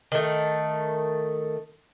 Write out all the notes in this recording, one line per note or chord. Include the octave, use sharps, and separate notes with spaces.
D#3 A3